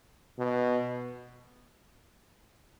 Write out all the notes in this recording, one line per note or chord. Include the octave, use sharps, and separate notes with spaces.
B2